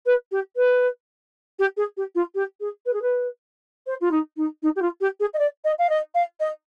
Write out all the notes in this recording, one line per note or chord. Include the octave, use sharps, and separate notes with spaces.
B4
G4
B4
G4
G#4
G4
F4
G4
G#4
B4
G#4
B4
C5
F4
D#4
D#4
D#4
G4
F4
G4
G#4
D#5
D5
D#5
F5
D#5
F5
D#5